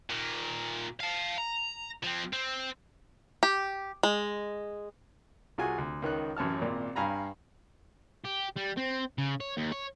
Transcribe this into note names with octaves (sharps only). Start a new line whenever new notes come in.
A#2 D#3
F5 A5
A#5
F3 C4
C4
G4
G#3
C2 C3 F4 F#4 G#4 G#5
D2
C#2 D#3 D#4 F#6
A1 F#2 C#5 A5 F6
G#1 A#2 A#3 D5
G2 F5 G#5 A#5 B5
G4
G3
C4
C#3
C#5
D#2
C#5